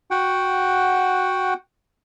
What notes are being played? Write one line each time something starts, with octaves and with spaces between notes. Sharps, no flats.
F#4 F#5 G5